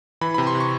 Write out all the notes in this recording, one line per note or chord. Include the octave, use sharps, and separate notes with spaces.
E3 B5
C3 B5
C6
C3
C#6